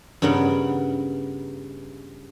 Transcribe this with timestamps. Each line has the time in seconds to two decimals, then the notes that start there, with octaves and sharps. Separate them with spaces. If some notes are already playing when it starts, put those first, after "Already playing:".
0.22 G2 C#3 B3 A#4 F#5